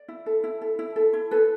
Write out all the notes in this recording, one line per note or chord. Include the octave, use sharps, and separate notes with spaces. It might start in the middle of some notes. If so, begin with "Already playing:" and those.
Already playing: D5
E4
A4
E4
A4
E4
A4
E4
A4 B4